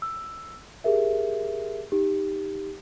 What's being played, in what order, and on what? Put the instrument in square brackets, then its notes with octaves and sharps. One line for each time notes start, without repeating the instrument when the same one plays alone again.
[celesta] E6
G4 G#4 A#4 E5
D#4 G4